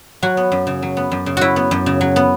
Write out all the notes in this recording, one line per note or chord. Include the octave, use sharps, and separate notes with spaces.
F#3 F#4
B3
F#2
C#3
F#3
B3
F#2
C#3
F#3 E4 F#4
B3
F#2
C#3
F#3
B3